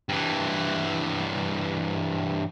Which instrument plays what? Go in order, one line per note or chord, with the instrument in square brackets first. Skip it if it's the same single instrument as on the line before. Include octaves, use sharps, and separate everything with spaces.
[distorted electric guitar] G2 E3